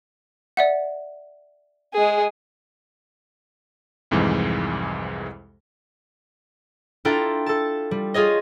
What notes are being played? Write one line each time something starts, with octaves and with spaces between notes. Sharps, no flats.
D5 E5 F#5
G#3 G#4
C2 F2 G#2 E3 G#3
D4 E4 F4 A4 G5 A#5
A4 A5
G3
F4 G#4 C#5 D#5